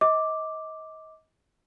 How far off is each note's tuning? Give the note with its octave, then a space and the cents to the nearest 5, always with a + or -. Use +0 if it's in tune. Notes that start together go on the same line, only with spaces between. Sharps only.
D#5 +30 D6 +0